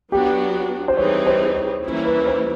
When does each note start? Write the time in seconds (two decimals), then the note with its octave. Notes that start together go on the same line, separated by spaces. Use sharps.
0.12 F#3 B3 D4 F#4 G4
0.88 C5
0.97 E3 G3 C4 D#4 G#4 C#5
1.27 C5
1.55 C#5
1.84 E3 G3 A#3 C#4 E4
2.06 B4
2.27 C5